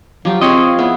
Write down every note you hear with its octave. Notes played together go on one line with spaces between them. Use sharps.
F3 F#3 F4 G4
C4 F4 G#4 C#5 D#5
B3 E4 G#4